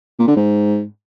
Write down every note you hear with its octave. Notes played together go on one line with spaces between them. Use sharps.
A#2
D3
G#2